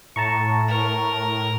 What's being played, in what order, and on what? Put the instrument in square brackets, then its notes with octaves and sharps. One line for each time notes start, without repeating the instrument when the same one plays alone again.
[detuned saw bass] A2 [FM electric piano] A5 A#5 C#6
[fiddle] A#4